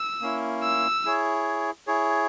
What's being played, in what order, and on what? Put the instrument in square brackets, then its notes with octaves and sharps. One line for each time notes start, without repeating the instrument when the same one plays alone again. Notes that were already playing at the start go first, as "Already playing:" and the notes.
Already playing: [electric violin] E6
[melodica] A#3 C#4 E4
[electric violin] E6
[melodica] E4 G#4 C#5
E4 G#4 C#5